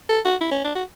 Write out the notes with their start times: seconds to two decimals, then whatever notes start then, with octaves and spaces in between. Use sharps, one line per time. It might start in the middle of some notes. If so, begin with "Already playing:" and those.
0.09 A4
0.25 F#4
0.41 E4
0.51 C#4
0.64 D4
0.75 F#4